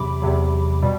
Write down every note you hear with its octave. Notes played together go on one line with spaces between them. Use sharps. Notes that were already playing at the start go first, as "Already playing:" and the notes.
Already playing: E2 C3 F#3 B5 D6
E2 C3 F#3
B2 G3